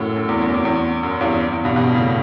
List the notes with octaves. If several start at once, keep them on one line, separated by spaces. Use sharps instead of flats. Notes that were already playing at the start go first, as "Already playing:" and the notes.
Already playing: F#2 A2
F#2
E2
F#2
E2
E2
F#2
E2 G2
E2
G2 B2
G2 B2
A2 C#3